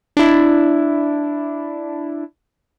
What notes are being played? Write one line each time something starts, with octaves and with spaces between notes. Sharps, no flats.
D4 E4